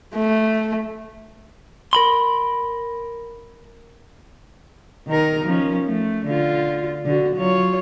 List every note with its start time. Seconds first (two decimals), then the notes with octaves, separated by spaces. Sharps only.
0.15 A3
1.93 A#4 B5 C6
5.07 D#3 D#4 A#4
5.45 F3 C#4
5.86 A3
6.26 D3 F4
7.05 D3 F#4
7.36 F#3 F4 C#5